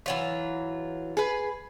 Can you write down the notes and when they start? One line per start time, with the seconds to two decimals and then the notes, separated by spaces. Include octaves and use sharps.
0.06 E3 F#3 F4
1.17 G#4 B4